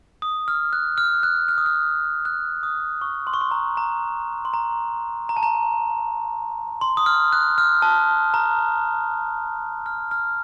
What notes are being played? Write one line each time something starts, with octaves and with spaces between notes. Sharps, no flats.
D#6
F6
F#6
F6
F#6
F6
D#6
F6
F#6
D#6
C#6
C6
C#6
C6
A#5
A#5
C6
A#5
A#5
A5
A#5
C6
D#6
F6
F#6
F6
A5
A#5
F6
F6